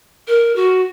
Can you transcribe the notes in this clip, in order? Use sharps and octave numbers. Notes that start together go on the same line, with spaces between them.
A#4
F#4